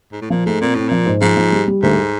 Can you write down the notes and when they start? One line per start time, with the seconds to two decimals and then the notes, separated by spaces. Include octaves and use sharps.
0.13 G#2
0.22 A2
0.30 A#2 F3
0.46 G#2 A3
0.61 A#2 C4
0.75 A2 C4
0.89 A#2 F3
1.06 G#2
1.22 G#2 F3
1.37 F3
1.52 G3
1.68 G3
1.83 D2 G#2